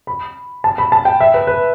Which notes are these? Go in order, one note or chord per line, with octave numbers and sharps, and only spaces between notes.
B5
A5
B5
A5
G5
E5
B4
B4